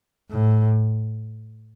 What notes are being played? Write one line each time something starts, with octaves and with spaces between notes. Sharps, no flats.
A2